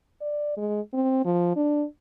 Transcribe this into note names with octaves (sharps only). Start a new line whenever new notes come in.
D5
G#3
C4
F3
D4